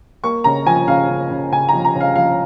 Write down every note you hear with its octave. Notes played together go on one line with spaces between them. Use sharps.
A#3 C#6
C#3 A#5
F3 G#5
C#3 F5
C#3
C#3
C#3 G#5
F3 A#5
A#5
C#3
F5
F3 F5